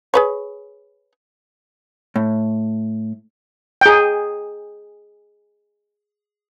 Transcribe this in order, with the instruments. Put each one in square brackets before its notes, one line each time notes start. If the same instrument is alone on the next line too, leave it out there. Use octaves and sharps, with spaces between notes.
[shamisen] G#4 B4 C#5
[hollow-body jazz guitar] A2
[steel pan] G#4 G5